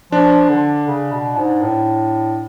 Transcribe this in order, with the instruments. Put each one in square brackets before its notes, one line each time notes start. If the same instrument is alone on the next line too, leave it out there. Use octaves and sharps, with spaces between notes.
[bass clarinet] F3 [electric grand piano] D4
[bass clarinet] D3
C#3
B2
G#2
A2